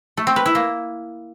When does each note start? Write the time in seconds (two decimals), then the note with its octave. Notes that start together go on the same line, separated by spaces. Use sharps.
0.17 A3
0.27 C4
0.36 B4
0.46 E4
0.55 A#3